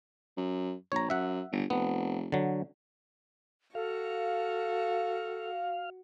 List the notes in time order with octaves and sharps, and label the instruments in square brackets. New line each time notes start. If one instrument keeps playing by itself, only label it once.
[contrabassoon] F#2
[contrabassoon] A#1 [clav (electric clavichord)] C#5 A#5
[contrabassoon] F#2 [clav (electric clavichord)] E5 F#5
[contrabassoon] G1
[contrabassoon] F1 [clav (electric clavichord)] B3
[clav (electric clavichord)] D3 F#3
[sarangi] F#4 [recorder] A4 [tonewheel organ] F5